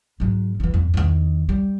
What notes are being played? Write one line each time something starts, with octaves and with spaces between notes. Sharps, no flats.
G#2 F#3
D3 E3
F2
E2 D#3
G3